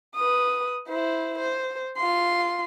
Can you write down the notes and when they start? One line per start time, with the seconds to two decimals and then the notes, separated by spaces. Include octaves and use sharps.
0.15 B4 D#6
0.89 E4 C5
1.38 C5
1.97 F4 C6